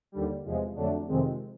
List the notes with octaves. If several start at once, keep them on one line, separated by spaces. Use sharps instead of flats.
D#2 D3 G3
E2 C3 F3 G#3
F2 D3 F#3 A3 D4
F2 C3 D#3 G#3 C4